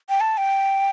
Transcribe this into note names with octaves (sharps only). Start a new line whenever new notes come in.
G5
A5
G5